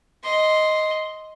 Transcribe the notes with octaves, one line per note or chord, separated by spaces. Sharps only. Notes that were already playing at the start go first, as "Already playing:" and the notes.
D#5 C6